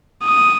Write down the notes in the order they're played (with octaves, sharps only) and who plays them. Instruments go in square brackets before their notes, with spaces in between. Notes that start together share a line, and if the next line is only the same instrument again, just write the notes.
[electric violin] D#6